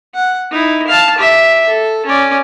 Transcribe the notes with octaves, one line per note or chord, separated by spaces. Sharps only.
F#5
D#4 E4
F5 A5
G4 E5
A4
C#4 D5